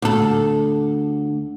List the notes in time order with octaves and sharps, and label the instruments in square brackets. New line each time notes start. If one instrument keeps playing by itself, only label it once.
[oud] D2 A4